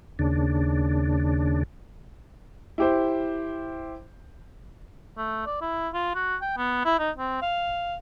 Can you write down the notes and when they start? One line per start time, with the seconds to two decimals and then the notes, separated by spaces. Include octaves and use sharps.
0.19 D#2 C#3 D4
2.78 E4 G4 C5
5.18 A3
5.46 D5
5.61 E4
5.94 F4
6.15 F#4
6.42 G5
6.57 B3
6.85 E4
6.99 D#4
7.18 C4
7.42 F5